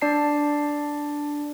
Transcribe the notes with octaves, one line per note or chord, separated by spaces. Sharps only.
D4 D5 A5 C7